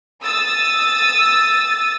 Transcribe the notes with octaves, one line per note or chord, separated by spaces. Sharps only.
D#6 E6 A6